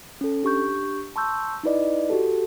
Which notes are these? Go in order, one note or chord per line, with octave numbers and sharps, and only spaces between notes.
C#4 A4
D4 G4 C#6 G6
A5 C6 C#6 E6 G6
D#4 E4 B4 D5 D#5
F#4 G4 A4